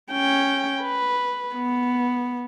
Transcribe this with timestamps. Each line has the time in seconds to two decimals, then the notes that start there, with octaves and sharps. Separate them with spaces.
0.12 C#4 G5
0.82 B4
1.55 B3